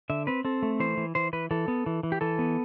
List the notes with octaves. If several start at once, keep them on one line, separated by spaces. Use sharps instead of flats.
D3 E5
C4 B4
C4 A4
A3
E3 C5
E3
E3 C5
E3 B4
E3 A4
B3
E3
E3
G4
E3 A4
B3